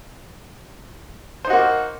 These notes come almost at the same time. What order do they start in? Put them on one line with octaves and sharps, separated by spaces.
C5 D#4 F#4 A#3